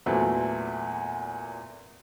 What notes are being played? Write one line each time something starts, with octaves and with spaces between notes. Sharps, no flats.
E2 A#2 F#3 A3 C4 B4